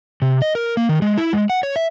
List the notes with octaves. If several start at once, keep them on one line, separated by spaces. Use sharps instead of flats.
C3
D#5
A#4
A#3
D#3
G#3
E4
G#3
F#5
C#5
E5